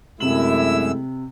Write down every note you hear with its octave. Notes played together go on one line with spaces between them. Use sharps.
F#2 C3 G#3 A3 E4 E6 F#7